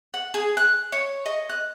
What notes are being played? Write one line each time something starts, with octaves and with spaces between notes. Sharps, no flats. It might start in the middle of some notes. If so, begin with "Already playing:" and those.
F#5
G#4
F#6
C#5
D#5
F#6